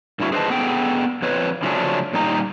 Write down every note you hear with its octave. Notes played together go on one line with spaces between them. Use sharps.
G2 D3 E4 F#4
G#4 B4 C5 D5 D#5 A5
B3 G#4 A4 G5
F2 B4 C#5
C#3 F3 F#3 A3 C#4 D4
A#2 G3 D#4 A#5